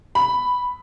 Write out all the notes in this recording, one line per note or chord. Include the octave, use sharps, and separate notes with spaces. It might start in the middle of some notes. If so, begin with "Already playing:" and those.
B5